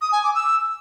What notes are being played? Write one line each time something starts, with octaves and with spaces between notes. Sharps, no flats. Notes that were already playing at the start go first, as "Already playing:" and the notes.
D#6
G#5
D6
E6